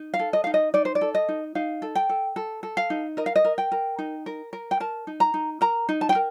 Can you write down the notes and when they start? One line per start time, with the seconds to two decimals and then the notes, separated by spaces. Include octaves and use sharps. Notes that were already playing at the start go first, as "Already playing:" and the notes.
Already playing: D#4
0.14 F5
0.19 A4
0.33 D#5
0.44 D#4 F5
0.54 D#5
0.74 D#4 D5
0.85 C5
0.95 D5
1.01 A4
1.15 D#5
1.29 D#4
1.55 D#4 F5
1.82 A4
1.95 G5
2.09 A4
2.36 A4
2.63 A4
2.77 F5
2.90 D#4
3.17 A#4 D#5
3.26 F5
3.36 D#5
3.45 A#4
3.58 G5
3.72 A#4
3.99 D#4
4.26 A#4
4.53 A#4
4.71 G5
4.80 A#4 A5
5.07 D#4
5.20 A#5
5.34 D#4
5.61 A#4 A#5
5.89 D#4
6.01 A5
6.09 G5
6.15 A#4